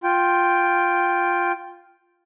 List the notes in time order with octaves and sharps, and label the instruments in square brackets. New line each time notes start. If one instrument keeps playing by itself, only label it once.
[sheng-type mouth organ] F4 G5